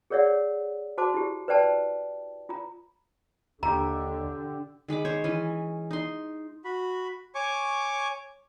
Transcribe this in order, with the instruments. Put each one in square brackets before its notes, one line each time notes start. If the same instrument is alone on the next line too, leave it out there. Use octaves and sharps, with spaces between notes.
[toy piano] G#4 A#4 C#5 D5 E5 F#5
F#4 C5 A5 D6
E4 G4
B4 C5 D5 G5 A5
F4 A#5
[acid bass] D#2 [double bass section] D3 [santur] G4 E5 [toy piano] A#5
[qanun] D#3 G#3 B5 D6
C5 C#5
E3 C#4
D#4 C6
[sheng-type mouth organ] F#4 B5
C#5 G#5 C#6 D6